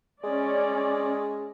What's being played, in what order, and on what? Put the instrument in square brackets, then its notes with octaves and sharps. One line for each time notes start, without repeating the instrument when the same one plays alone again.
[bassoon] G#3 [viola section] C#4 D5